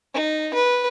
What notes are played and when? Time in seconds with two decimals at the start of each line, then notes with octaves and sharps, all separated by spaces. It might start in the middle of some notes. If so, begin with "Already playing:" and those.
0.14 D#4
0.54 B4